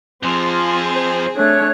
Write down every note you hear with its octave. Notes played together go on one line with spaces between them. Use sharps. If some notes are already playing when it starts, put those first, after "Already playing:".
F2 F3 C4 F4 G#4 C6
C5
A3 D4 C#5 F#6